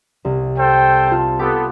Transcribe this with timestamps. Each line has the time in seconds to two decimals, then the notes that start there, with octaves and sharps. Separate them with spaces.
0.25 C2
0.59 A4 C5 G5
1.07 F4 A5
1.39 B3 G4 A4 D6 B6